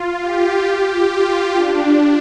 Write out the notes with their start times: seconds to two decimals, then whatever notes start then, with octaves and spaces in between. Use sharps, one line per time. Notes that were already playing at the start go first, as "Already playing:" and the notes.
Already playing: F4
0.21 G4
1.11 F4
1.56 D4